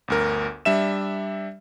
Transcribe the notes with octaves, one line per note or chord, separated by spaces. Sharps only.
G1 D2 A#4
G3 D4 E5 E7